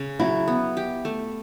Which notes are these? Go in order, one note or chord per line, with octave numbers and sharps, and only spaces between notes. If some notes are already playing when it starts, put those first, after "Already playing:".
Already playing: C#3
F#3 E4
B3
G4
A3